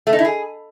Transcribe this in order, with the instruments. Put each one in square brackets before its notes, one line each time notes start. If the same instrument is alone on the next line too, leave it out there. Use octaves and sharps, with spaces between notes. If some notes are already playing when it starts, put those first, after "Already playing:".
[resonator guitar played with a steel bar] A3
D#4
E4
G#4